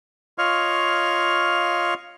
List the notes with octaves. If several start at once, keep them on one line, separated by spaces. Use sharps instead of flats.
F4 C#5 D#5 F5 C#6 F6